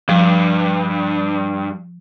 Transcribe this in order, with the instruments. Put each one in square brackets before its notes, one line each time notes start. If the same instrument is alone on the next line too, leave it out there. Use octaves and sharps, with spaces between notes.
[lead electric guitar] G2 [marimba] F3